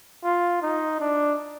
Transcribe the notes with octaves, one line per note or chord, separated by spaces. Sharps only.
F4
D#4
D4